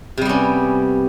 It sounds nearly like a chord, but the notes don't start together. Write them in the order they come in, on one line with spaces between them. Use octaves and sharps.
C3 G3 B3 C#4